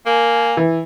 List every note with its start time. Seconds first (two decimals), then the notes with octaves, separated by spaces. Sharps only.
0.06 A#3 G#5
0.57 E3